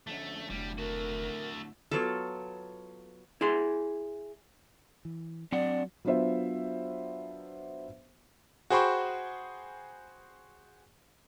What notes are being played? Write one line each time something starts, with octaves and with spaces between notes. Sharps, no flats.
F2 D3 A3 C#4
F1 A2 D3 G3
A3 F#4 A#4
F#3 B3 F4 A4
E4 G#4 C6
E3
F#3 C4 D4 D5 F#5
F#3 B3 D4 F4 C5 E5
F#4 G#4 C5 G5 B5 C#6